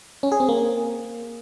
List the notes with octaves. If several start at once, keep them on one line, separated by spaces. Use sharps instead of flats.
C#4
G#4
C4
A#3